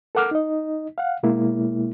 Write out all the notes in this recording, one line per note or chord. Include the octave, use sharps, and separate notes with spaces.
A4 A#4 F#5 D6 F6
D#4 D#5
F5 F#5
B2 G#3 A#3 E4